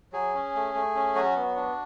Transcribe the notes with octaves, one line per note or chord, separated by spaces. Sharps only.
F#3 G#4
C#4
A3
A3
C#4
F#3 F#4
B3
D4